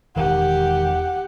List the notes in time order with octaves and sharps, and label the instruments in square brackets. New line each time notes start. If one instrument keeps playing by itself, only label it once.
[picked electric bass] E1 D#3 [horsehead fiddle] G4 F#5